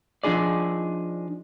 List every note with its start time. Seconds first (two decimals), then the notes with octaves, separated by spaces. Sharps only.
0.24 F3 D4 D#4 G#4 D5